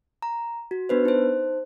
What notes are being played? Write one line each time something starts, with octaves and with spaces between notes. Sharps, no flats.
A#5
F#4
B3 D4 B4 C5
D#4 C5